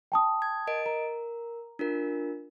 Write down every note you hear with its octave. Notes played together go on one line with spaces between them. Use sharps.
G5 A5 D#6
G#6
A#4 D#5 D7
A#4 A#5
D4 F4 A#4